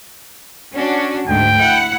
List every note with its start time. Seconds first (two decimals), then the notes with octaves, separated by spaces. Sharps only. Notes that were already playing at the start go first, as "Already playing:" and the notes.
0.75 C#4 D4 F#4
1.28 D2 G#2 G5
1.57 E4 F#5